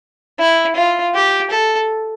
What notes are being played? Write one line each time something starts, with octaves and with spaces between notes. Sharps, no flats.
E4
F4
G4
A4